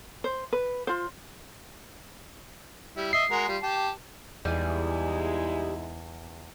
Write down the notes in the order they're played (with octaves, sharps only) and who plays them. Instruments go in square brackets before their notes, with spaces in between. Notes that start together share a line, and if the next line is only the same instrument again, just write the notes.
[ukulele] C5
B4
F4 C5
[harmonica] G3 E4
[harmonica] D#5 E5 [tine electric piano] C7
[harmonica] G#3 F#4 A#4
G3 F4
G4 A5
[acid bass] E2 [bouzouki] G3 G#4 [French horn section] G#3 D#4 E4